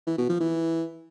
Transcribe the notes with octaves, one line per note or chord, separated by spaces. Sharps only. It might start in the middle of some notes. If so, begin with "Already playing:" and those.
E3
B2
F3
E3